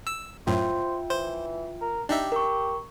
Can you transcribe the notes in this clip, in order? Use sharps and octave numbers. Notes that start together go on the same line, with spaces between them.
E6
F#2 A2 F4 C5 E5 G5
E3 C5
A#4
D4 D#4 G4 E5
A#4 C#6